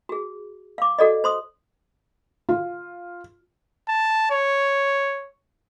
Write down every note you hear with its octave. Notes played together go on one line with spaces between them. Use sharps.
F#4 G#4
F5 D6
F#4 A4 D5 D#5
C5 C6 D#6
F4
A5
C#5